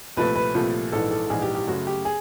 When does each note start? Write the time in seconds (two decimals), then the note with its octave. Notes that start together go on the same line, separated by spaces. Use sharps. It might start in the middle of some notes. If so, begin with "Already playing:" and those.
0.17 C2 A#2 F3 A3 B4
0.36 B4
0.55 C2 A#2 F3 A3
0.92 A#1 G#2 E3 A4
1.11 A4
1.30 A#1 G#2 E3 G#4
1.42 G4
1.55 G4
1.67 F#2 C#3 F#3 A3 F#4
1.87 G4
2.05 G#4